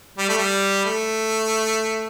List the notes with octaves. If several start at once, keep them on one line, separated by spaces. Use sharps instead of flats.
G3
A3
G3
A3